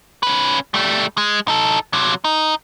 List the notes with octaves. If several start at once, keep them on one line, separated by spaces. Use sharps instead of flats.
C#4 B4
G3 A3
G#3
D#4 A4
C3 F#3
D#4